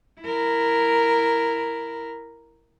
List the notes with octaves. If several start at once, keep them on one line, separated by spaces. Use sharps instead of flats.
E4 A#4